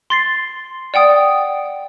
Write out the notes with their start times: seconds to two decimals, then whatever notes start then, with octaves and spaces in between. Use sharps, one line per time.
0.10 C6 A6 C7
0.94 D5 F#5 G5 D#6